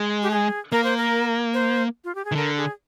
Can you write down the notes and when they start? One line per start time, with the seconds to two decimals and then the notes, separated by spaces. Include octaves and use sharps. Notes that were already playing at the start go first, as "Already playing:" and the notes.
Already playing: G#3
0.23 G4
0.31 G#4
0.72 A#3 A#4
0.84 C5
0.97 A#4
1.54 C5
2.04 F4
2.15 G4
2.25 G#4
2.32 D#3
2.35 D3 A#4
2.57 G#4